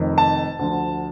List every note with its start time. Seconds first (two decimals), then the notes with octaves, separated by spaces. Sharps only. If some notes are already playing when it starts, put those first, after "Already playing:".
Already playing: F1 F2 D#3
0.18 A5
0.59 D2 D3 F3